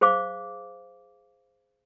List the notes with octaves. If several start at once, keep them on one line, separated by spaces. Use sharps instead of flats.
G#4 C5 F5 D6